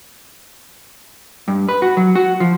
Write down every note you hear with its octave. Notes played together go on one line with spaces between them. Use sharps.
G2
B4
F#4
F#3
F#4
F3